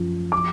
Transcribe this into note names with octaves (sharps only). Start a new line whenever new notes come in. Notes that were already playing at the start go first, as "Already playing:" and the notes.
Already playing: F#2 F3
F3 D6